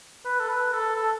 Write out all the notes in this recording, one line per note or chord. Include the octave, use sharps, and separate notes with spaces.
B4
A4
B4
A4
A4